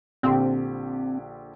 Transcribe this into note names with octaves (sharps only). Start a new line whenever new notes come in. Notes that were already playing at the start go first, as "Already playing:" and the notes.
A#1 D3 C4 G4